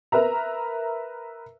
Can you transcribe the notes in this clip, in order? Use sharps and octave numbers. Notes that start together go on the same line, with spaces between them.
A#4 B4 E5 A#5